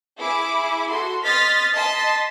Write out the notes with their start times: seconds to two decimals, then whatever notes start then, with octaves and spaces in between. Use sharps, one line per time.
0.19 E4 G#4 D6
0.89 F#4 A4 C6
1.24 D#5 C6 D#6 F6 A6 B6
1.75 D#5 A5 C6 B6